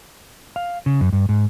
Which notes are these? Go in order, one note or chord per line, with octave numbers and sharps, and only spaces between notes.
F5
C#3
F#2
G2
G#2